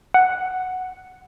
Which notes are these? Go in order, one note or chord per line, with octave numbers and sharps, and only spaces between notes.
F#5